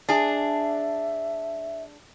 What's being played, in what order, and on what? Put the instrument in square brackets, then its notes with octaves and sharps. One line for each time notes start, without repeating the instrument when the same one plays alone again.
[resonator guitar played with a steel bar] D4 G#4 [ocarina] E5